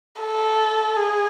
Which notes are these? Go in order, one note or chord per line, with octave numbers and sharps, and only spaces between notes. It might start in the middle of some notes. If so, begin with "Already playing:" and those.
A4
G#4